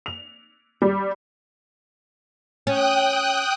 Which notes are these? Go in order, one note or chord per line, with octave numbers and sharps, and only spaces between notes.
F7
G3
C#4 G5 D#6 F#6